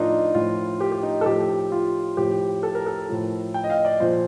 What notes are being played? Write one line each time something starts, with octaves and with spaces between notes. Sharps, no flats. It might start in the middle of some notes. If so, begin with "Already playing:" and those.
Already playing: A2 F3 D4 D#4 F4 A#4
A2 F3 F4
G4
G4
D#4
A4
A2 F3 G4
F4
A2 F3 G4
A4
A#4
A4
A2 F3
G5
D#5
F5
D#5
D5
A#2 F3 C5